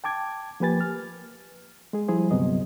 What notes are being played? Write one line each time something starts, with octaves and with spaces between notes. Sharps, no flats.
G5 A5 D6 G#6
F3 A#3 G4 B4 G#5 A6
F6
G#3 G#4
F3 G3 E4 G#4 C5
D2 G2 C3 F#3 B3 D#5